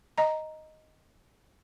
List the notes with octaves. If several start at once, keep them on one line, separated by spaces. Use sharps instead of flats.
D#5 A#5